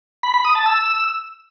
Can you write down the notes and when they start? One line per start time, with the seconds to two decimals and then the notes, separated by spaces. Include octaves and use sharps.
0.23 B5
0.34 B5
0.45 D#6
0.55 A5
0.66 E6